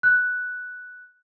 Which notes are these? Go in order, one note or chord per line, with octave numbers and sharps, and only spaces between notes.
F#6